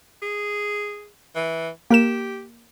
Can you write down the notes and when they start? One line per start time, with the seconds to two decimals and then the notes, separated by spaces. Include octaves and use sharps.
0.22 G#4
1.35 E3
1.90 A#3 G4 A#4 E7